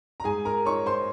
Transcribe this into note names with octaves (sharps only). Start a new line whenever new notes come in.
A#5
G#2 G#4 G#5
A#4 A#5
D#4 C#5 C#6
C5 C6